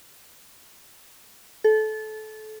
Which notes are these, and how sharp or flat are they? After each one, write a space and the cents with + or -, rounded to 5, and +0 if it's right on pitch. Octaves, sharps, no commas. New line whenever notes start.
A4 -25